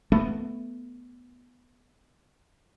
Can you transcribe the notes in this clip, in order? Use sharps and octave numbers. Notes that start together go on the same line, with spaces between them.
A3 B3